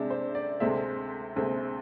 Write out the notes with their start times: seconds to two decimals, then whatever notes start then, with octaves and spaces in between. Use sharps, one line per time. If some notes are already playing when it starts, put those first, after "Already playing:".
Already playing: C3 G#3 D4 E5
0.10 C5
0.35 D5
0.60 D2 C3 G#3 C4 E5
1.36 D2 C3 G#3 C4